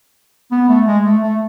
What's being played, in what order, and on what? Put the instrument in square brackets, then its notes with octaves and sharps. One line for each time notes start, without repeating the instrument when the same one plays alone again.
[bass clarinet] B3
A3
G#3
A3
A3